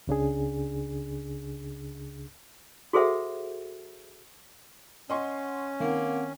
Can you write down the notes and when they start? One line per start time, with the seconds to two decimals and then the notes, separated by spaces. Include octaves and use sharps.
0.07 C#2 C#3 D4 G#4
2.93 F#4 G#4 A4 C5 E5 F#5
5.10 C#4 D#5 F#5 C6 C#6
5.80 D#3 A#3 C4 F#5